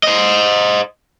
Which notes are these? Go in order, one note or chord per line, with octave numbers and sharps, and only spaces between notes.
C5 D#5